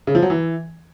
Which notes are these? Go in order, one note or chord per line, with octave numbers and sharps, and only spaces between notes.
C#3
F3
F#3
E3